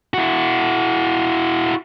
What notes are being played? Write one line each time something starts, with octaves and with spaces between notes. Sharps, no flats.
E4 F#4